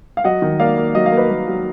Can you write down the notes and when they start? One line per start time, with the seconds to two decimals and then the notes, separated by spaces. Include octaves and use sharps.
0.17 F5
0.24 F#3 D#5 F#5
0.42 D#3
0.60 A#3 D5 F5
0.77 A#3
0.95 F#3 D#5
1.06 F5
1.12 A#3
1.17 B4 D#5
1.30 A#3
1.48 F#3